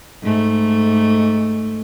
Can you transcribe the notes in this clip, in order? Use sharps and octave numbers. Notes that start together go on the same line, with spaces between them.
G#2 A3